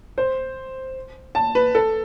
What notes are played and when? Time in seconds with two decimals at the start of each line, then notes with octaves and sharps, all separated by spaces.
0.18 C5
1.35 A5
1.55 B4
1.75 A4